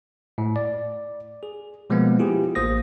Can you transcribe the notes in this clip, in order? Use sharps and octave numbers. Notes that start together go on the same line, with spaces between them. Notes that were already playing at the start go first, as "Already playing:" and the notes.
A2
D5
G#4
B2 F3 G#3 A#3 B3
E4 F4 G4 G#4
A1 A#3 C5 D#6 A#6